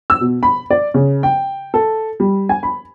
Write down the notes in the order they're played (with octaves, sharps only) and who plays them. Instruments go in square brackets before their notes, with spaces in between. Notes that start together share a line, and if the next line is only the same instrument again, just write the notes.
[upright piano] E6
B2
B5
D5
C#3
G5
A4
G3
G#5
B5